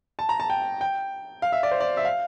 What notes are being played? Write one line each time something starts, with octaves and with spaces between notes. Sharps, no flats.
A5
A#5
A5
G5
G5
F5
E5
D5
C5
D5
E5
F5